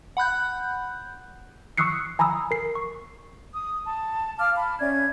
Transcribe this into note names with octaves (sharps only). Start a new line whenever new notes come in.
F#5 B5 F#6 G6
C#6 D#6 E6 F#6 C7 C#7
G#5 A#5 B5 D#6 E6
A#4 C7
C#6
D#6
A5
F5 A5 D6 F6
A5 B5
C#4 D5 E5 G#6